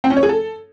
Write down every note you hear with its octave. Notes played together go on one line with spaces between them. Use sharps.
C4
C#4
C#5
G#4
A4